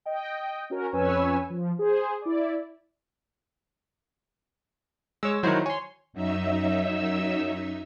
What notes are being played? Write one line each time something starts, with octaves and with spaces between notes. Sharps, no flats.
D#5 G5
C#4 F#4 A#4
F2 C#4 B4 C#5 G#5 E6
F3
G#4 C5
E4 D5
G#3 C#5 E6
D#3 F#3 D#4 E4 F#4 C5
C#5 G#5 C6
F#2 F#3 D#4 E5 E6